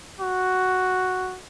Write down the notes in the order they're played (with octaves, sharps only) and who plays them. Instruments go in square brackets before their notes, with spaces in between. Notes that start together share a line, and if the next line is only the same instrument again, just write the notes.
[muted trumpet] F#4